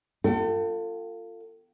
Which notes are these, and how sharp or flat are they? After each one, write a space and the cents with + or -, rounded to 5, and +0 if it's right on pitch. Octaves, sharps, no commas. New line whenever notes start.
F4 +0 A4 +35 G5 -35